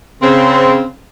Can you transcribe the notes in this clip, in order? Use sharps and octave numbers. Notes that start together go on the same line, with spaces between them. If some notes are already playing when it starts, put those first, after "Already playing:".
C#3 C4